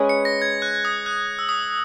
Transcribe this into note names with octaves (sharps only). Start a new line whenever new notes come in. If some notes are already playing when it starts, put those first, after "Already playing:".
Already playing: G#3 C#4 G#4 B4
C#7
A#6
G#6
F#6
D#6
F#6
E6
D#6